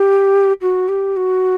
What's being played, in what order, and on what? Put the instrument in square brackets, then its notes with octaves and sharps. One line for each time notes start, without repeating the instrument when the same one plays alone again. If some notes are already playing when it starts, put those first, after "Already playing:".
Already playing: [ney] G4
F#4
G4
F#4